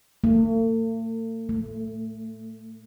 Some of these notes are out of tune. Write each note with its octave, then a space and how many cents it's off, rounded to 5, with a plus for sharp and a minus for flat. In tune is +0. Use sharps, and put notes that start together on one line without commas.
A3 +45
A3 +10